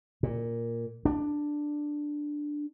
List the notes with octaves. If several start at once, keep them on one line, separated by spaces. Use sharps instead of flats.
A#2
D4